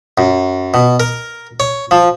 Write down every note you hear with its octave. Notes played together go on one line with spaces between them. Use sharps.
F#2
B2
A#4
C#5
F3